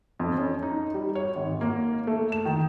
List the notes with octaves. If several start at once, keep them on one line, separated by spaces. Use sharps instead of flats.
F2
C#4
D#4
G3
C#5
G#1
A#3
A3
E7
D#3